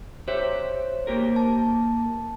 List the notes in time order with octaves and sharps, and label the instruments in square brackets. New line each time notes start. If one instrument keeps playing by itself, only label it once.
[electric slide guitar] G4 E5 [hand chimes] C5 C#5
[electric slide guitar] A#3 G4 A#4
[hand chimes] A5